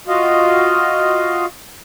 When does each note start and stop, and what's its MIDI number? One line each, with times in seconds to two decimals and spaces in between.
0.08 1.45 65
0.08 1.45 66
0.08 1.45 75
0.08 1.45 77